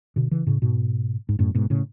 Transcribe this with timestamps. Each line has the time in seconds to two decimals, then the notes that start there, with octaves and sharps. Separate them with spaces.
0.16 B2 D3
0.31 C#3 E3
0.47 A2 C#3
0.62 G#2 B2
1.29 G#2
1.39 F#2 A2
1.55 G#2 B2
1.70 A2 C#3